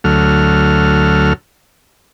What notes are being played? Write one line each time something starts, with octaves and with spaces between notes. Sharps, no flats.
D2 F#3 A3 F6